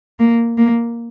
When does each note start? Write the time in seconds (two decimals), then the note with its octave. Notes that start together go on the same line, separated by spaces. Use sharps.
0.19 A#3
0.58 A#3